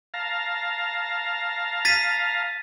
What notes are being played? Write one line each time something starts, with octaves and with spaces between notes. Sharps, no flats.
F5 A5 A#5
A6 B6 D#7